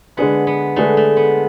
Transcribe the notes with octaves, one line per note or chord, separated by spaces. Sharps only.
D3 G#3 B3 D4 G#4 B4
B3
D3 G#3 A3 D4 G#4 B4
A3
B3